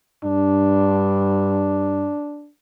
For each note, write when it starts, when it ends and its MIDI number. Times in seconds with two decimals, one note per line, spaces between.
0.24 2.11 43
0.24 2.49 62